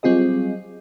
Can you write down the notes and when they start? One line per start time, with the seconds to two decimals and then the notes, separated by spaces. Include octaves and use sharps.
0.03 F#3 G3 C4 F4 G#4 D#5